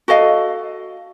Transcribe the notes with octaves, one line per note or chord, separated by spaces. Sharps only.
F#4 A4 D#5 F5